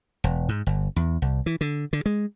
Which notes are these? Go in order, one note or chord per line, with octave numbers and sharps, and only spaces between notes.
E1
G#2
G1
E2
C2
E3
D3
D3
G#3